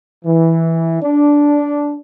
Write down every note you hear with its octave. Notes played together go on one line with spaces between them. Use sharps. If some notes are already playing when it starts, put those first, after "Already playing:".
E3
D4